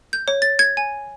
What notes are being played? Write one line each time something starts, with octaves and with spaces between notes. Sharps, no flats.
G6
C#5
A6
G#6
G#5